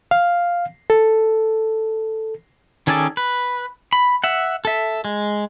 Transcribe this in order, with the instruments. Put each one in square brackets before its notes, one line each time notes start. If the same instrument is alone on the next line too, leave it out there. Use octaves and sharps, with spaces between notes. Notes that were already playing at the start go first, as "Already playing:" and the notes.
[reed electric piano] F5
A4
[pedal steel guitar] D#3 C#4 G#4 A4 D5
B4
B5
E5 F#5
A4 E5
G#3